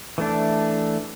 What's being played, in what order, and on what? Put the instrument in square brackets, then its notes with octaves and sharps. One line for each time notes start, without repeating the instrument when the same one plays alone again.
[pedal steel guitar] E3 A3 D4